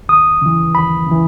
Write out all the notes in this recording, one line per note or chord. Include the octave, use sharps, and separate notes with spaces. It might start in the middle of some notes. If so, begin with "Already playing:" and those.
D#2 D#6
C#3 E3
D#2 B5
C#3 E3